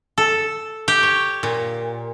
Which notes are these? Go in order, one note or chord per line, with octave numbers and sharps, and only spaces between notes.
A4
G4
C#5
A#2